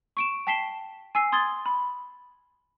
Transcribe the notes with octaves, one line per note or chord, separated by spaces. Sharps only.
C#6 D7 E7
G5 A5 B6 C7 E7 G7
G#5 E6 C7
C6 D#6 G#6 A6 G7
B5